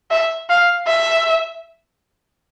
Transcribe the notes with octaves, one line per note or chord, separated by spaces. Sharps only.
E5
F5
E5